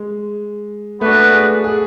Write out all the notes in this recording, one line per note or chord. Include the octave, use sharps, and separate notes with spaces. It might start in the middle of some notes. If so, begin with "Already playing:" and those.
Already playing: G#3
A3 B3 D4 F#4 B4
G#4
G#4